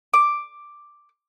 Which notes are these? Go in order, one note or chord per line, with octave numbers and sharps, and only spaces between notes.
D6